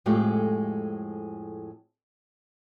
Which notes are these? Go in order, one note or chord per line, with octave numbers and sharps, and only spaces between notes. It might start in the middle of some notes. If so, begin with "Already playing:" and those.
F2 A2 G#3 A3 F4 G4